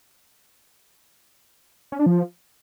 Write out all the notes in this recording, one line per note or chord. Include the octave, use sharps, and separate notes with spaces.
C#4
D4
F3